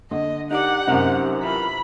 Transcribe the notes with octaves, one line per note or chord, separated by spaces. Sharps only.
D3 D#5
D#4 G4 A#4 D5 F#5
F#2 C3 D#4 A#4 C5
E3 F4 A#4 B5